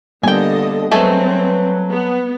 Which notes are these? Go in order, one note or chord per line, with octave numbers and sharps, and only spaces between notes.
D3 G3 A#3 B3 A4 D#5 G5 G#5
F#3 G#3 A3 C4 A4 B4
B3